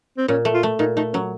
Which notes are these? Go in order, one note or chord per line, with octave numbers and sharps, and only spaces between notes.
C4
A#2 C#4
A3
F4
A3
A#2 D#4
A3 D#4
F#3 C#4